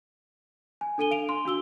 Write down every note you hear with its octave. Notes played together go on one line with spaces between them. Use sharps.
G#5
D4 A4 G#5 D#7 G7
F5 D7 F7
C6
D4 F#4 E6 G7